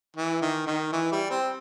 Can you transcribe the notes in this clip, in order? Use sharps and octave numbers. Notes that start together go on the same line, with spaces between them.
E3
D#3
D#3
E3
G3
C4